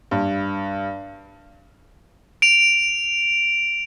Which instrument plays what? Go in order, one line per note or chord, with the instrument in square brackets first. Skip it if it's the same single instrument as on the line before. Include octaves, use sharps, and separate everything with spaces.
[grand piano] G2
[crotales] D7 F7